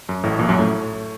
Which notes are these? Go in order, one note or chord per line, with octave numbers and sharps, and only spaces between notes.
F#2
A1 A2
A#1 A#2
F#2 F#3
A2 A3